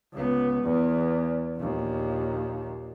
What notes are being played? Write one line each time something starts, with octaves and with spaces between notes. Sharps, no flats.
C#2 B3
E2
A#1 D#2